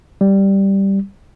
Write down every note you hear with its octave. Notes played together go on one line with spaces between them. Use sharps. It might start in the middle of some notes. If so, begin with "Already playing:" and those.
G3